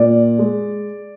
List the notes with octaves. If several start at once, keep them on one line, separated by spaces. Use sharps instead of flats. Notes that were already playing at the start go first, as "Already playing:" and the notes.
Already playing: A#2 D5
G#3